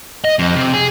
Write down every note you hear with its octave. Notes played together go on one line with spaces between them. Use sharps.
D#5
F2
C3
G#4